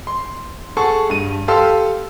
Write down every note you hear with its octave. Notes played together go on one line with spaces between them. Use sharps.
C6
G#4 A4 F#5 A5 C#6
G2 D#7
G4 A4 F5 A5 C6 E6